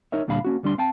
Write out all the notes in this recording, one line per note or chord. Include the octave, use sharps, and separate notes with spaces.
D#4 A#4 C#5 E5
D2 A#2 D3 G3 F5 B5
A#3 C#4 F#4
D2 G3 D4 C6
C4 F5 G5 A5